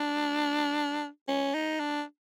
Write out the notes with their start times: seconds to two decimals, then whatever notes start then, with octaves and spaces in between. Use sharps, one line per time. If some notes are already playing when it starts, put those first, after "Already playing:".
Already playing: D4
1.28 C#4
1.54 D#4
1.79 D4